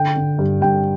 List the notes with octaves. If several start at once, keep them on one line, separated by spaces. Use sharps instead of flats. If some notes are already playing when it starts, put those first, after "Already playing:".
Already playing: D3 G5
D3
G2
G2 G5